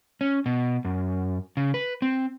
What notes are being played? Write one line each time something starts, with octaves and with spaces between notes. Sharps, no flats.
C#4
B2
F#2
C#3
B4
C4